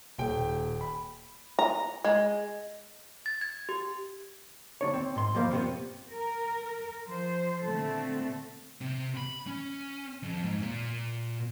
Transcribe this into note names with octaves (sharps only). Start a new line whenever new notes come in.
D#1 G5
B5
A#5
G#3
A6
G#6
G4
D2 D4 C#5
C4
G#2 C6
F2 F3 A#3 C5 F5 B5
G2 C3 F3 A3 B3 C4
A#4
F3 C5
A#2 D3 A3 C4 A4
C3
B5
C#4
F2
G#2
A#2